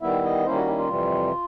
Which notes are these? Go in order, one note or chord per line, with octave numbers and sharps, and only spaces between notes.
D#3 G3 B3 E4 E5
D#5
D#3 G3 A#3 C#4 E4 C5
F#4
E4
F4
F2 C3 E3 G3